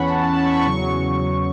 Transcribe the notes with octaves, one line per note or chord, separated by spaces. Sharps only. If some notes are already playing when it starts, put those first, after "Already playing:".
Already playing: E2 E3 C#4 F#5 B5 C#6
A5
A5
B5
C#6
B5
E2 C#3 F#3 C#6